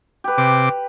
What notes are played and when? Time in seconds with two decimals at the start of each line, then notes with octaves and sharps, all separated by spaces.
0.24 G4 B4
0.38 C3 D6